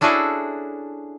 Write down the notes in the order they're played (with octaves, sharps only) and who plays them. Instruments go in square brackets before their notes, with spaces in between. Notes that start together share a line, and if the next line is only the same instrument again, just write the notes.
[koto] C#4 D4 E4 F#4 G#4 A4